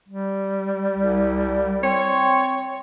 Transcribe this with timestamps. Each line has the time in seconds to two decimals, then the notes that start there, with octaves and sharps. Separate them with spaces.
0.09 G3
0.98 C2
1.83 C4 C#5